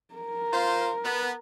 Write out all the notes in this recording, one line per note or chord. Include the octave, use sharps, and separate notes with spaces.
A#4
F4 C5
B3